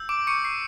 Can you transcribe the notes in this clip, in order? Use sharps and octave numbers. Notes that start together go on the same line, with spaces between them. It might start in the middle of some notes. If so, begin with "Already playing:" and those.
Already playing: E6 G6
D6 D7
C#6 C#7
C7